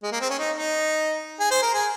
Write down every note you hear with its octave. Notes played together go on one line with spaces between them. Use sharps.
G#3
A#3
C4
C#4
D#4
D#4
G#4
C5
A#4
G#4